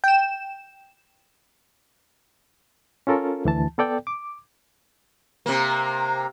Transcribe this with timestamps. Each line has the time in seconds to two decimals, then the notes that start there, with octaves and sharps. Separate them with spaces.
0.04 G5 E7
3.07 C#4 F4 A4 A#4
3.45 D2 E3 A5
3.78 B3 A4 D5 G5
4.07 D6
5.46 C3 A#3